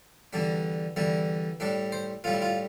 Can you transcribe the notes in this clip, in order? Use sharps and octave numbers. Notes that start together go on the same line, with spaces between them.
E2 D3 G3 D4
E2 D3 G3 E4
A2 G3 D4
C5
A2 G3 F4
E4
F4